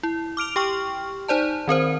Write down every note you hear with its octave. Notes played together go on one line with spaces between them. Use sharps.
E4
D6 F6 D7 F7
G4 G5 C#6 F6
D#4 C5 D5 A5
D#3 C4 A#4 C5